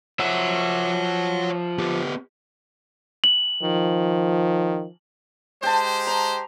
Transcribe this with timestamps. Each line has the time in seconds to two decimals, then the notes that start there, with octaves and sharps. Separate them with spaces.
0.20 F3 C#5 E5 F#5
1.78 B3 G4
3.24 F#7
3.63 D#3 F3
5.63 G#3 G4 C5 G5 A5
6.07 A#5